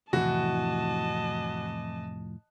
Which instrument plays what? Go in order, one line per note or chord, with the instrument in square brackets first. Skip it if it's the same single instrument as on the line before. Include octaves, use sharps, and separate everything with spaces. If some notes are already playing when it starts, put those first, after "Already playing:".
[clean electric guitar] F2 A2 C3 [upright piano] E3 [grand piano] F#4 [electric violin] D#5 A5